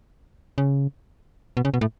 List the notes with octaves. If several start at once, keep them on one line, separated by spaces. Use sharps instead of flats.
C#3
B2
C#3
B2
A2